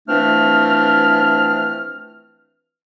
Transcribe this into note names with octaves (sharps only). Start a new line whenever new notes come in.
E3 F3 A3 C4 D4 F6